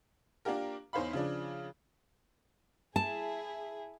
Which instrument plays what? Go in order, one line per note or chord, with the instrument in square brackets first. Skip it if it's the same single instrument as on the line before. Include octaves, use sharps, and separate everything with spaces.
[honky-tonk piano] A#3 D4 F4 G4 A#4
E2 D#4 C5 C#5 F5 B5
C#3 F3 D4
[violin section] E4 G#4 [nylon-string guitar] A5